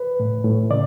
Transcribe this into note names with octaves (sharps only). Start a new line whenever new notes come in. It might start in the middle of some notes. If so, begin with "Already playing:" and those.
Already playing: B4
A2
A2
C#3 D5